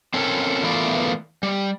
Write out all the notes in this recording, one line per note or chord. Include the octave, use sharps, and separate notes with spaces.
C4 C#4 A4 A#4
E3 A3 B3 F4 A#4 D5
G3